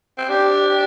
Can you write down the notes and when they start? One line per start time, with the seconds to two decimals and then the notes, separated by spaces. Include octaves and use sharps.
0.18 C4
0.29 D4 G4
0.69 G4